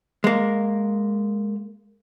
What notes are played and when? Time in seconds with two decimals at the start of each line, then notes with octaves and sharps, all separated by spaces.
0.24 G#3 A#3